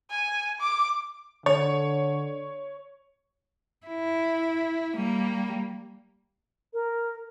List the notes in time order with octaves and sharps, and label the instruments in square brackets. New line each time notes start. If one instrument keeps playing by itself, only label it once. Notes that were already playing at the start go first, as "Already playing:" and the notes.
[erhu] G#5
D6
[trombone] D3 [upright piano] C#5
[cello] E4
G3 A#3
[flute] A#4